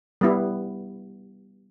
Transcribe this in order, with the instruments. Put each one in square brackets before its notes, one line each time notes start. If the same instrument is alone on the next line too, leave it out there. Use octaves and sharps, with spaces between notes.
[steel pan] G3 B3 E4